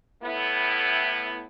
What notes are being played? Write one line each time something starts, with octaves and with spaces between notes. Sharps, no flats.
A2 B3 E4